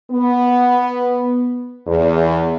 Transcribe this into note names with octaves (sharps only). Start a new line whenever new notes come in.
B3
E2